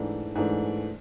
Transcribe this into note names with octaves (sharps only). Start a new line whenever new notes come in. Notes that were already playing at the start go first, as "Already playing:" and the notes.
Already playing: G#2 E3 A3 D4
G#2 E3 A3 D4